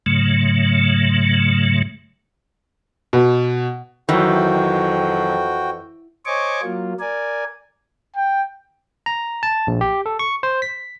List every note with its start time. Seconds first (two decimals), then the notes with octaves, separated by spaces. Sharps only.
0.06 G#2 C#3 F#3 A3
3.13 B2
4.09 F2 D#3 E3 F#3 F#4 G5
6.26 C5 C#5 D#5 G#5 C#6 D6
6.63 F#3 A#3 F4
7.00 A#4 D5 G#5
8.16 G5
9.06 A#5
9.43 A5
9.67 A#1
9.81 G4
10.06 A4
10.19 C#6
10.43 C5
10.62 B6